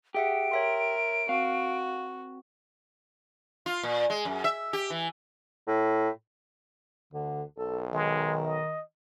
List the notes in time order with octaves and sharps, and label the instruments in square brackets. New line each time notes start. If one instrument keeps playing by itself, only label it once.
[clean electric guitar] G4 [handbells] G#4 E5 F#5 [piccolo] D7
[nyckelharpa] A#4 [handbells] C#5 E5 C6
[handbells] C4 [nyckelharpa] F#4 [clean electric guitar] F5
[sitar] F4
A#2
G#3
F#2
E5
G4
E3
[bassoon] A2
[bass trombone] D2 [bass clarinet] D3
[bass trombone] B1 [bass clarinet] A4
[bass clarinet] D#3 [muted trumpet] G#3
[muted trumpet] D#5